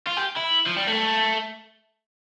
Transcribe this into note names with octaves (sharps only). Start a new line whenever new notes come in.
F4
G4
E4
F3
G3
A3